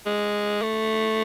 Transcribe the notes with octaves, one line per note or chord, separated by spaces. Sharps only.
G#3
A3